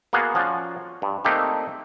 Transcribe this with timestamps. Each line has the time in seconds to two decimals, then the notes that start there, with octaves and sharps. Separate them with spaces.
0.13 A#3 B3 F#4 G#4 F5 F#5
0.35 F3 C#4 F4 F#4 D5
1.02 G2
1.25 A3 A#3 C4 D4 D#4 G4